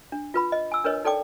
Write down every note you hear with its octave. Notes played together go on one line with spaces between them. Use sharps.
D4
F4 B4 B5
D#5
G#5 E6
D4 A#4 B4 C#5 D#5
D#4 A4 D5 G5 D6